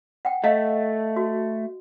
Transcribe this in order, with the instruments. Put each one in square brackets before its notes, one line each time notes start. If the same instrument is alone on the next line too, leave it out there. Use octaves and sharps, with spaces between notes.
[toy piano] F#5 G5
[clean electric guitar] A3 [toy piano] D#5 F5
[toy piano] F#4